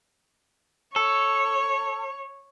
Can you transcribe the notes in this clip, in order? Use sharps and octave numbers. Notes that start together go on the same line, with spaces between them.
A4 C#5